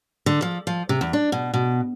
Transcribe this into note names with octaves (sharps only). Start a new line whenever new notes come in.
D3
F3
F3
C3
E2
D4
B2
B2